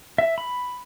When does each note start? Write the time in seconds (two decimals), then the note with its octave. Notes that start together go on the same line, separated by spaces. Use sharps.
0.18 E5
0.38 B5